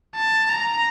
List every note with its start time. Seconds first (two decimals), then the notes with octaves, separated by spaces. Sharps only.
0.15 A5
0.49 A#5